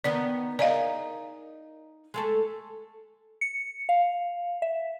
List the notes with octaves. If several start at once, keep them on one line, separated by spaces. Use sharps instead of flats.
D#3 B3 D4 D5
D#4 G#4 A#4 D5 D#5 F5
G#3 A3 A4
C#7
F5
E5